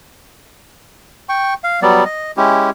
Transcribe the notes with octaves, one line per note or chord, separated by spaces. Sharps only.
G5 C#6
F5
F#3 G3 B3 D5
D#5
G#3 C#4 E4 G4